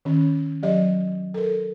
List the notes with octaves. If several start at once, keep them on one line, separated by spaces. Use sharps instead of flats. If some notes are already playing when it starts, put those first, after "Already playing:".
D#3 C#4
F#3 G4 D5 D#5
A4 A#4